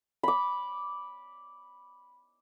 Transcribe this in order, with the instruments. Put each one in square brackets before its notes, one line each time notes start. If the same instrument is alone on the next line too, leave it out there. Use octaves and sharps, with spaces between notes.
[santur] B5 D6